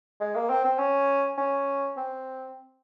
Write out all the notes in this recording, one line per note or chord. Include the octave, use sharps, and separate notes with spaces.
G#3
A#3
C4
C4
C#4
C#4
C4